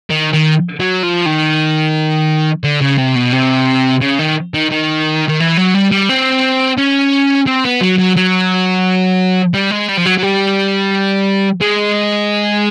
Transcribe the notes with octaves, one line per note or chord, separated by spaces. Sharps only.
D#3
D#3
F#3
F3
D#3
D3
C#3
C3
B2
C3
C#3
D#3
D#3
D#3
D#3
E3
F#3
G3
G3
C4
C#4
C4
B3
F#3
F#3
F#3
G3
G#3
G3
F3
F#3
F#3
G3
G#3